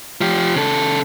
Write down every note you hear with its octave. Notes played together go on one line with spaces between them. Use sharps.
F3 G4
C#3 A4